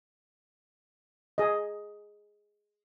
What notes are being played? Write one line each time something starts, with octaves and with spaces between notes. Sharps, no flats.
G#4 D#5